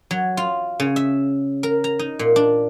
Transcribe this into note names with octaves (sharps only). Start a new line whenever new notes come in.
F#3
F4
C#3
E5
A#4
A#5
D#4
A#2
D4